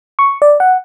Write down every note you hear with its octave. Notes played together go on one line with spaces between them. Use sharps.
C#6
D5
F#5